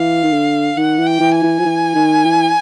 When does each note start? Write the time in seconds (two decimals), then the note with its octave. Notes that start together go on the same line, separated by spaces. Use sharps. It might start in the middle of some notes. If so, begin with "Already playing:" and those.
Already playing: E3 F5
0.23 D#3
0.32 D3
0.77 D#3 F#5
0.98 E3
1.06 G5
1.20 E3
1.35 G#5
1.43 E3
1.59 F3
1.65 E3
1.95 D#3
2.25 E3